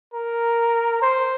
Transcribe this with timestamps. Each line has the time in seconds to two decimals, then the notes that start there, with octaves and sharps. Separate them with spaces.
0.14 A#4
1.02 C5